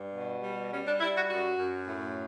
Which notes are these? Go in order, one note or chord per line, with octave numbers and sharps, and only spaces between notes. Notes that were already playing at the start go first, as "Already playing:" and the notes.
Already playing: G2
B2
G3
G3 C#4
D4
G3 E4
F#4
F#2 F#4
F#2
A2